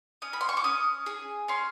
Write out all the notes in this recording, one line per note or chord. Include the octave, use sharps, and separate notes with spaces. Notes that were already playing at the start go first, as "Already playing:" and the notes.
C#4 D#6
B5
C6
C#6
D6
C#4 D#6
G#4
C#4 C6